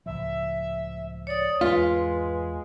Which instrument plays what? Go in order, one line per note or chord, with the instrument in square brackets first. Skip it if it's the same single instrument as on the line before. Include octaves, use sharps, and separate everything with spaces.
[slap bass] C#2 A2 F3 [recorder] E5
[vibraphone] C#5 D#6 [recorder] D5
[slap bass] E2 G#2 B3 [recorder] G#3 [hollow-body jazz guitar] F4 [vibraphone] B4